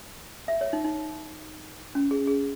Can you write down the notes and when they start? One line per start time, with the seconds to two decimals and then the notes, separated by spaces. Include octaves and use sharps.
0.48 E5
0.61 C#5
0.73 D#4
0.85 D#4
1.95 C#4
2.11 G#4
2.27 G#4